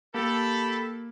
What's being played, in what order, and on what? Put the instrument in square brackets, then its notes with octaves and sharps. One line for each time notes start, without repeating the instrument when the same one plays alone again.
[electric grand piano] A#3 [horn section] G4 A4 [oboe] B5